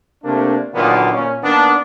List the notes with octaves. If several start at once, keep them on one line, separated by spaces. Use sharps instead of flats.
C3 A3 A#3 D4
A#2 D3 D#3 F#3 A#3 B3
A#2 C#4
D#3 A#3 B3 D4